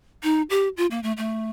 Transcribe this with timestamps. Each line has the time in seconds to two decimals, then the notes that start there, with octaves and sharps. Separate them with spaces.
0.23 D#4
0.50 G4
0.77 F4
0.91 A#3
1.03 A3
1.17 A3